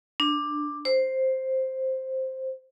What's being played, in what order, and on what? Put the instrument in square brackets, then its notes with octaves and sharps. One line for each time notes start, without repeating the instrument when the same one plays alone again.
[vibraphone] D4
C5